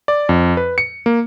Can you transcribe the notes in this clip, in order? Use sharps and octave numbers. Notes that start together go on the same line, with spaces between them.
D5
F2
B4
C#7
A#3